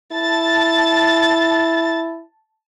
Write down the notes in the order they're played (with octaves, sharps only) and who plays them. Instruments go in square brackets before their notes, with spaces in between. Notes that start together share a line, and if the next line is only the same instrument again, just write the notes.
[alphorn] E4 [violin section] A5 A6